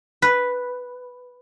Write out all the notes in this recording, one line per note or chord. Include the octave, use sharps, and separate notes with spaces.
B4